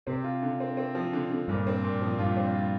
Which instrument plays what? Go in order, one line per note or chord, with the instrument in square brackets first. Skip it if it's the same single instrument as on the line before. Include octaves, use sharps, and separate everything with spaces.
[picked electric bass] C3 [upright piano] C4
[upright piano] F4
D3
C4
C4
F3
D3
D3
[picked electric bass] G2 [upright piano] A#2
[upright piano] C4
A#2
F3
[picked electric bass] G2 [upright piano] F4
[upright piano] C4
F4